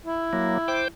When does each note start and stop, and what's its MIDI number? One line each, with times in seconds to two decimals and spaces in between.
0.06 0.84 64
0.33 0.58 54
0.33 0.58 58
0.68 0.88 72
0.68 0.88 79
0.68 0.88 86